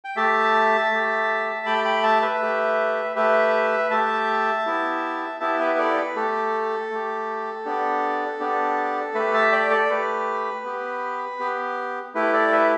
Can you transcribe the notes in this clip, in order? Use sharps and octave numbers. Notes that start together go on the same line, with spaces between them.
G5
A3 G4 E5 A5
A3 G4
A3 G4 G5 B5
G5 B5
E5 A5
B4 E5
A3 G4
A3 G4 B4 E5
A3 G4 E5 A5
B3 E4 G4
B3 E4 G4 E5 A5
B4 E5
A4 D5
B4
A3 G4 A4
A3 G4
B3 D4 G4
B3 D4 G4
A3 G4 B4 E5
E5 A5
D5 G5
A4 D5
A3 G4 B4
B3 G4
B3 G4
A3 E4 G4 B4
A4 D5
B4 E5